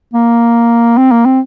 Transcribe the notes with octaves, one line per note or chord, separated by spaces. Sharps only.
A#3
C4
A#3
C4